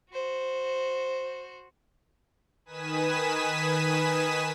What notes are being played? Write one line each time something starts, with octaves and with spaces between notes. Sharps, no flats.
F#4 C5
D#3 B4 G#5 D#6 B6 E7